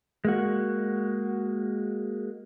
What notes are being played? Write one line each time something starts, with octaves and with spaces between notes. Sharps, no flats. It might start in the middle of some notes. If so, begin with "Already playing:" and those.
G#3 A#3 F#4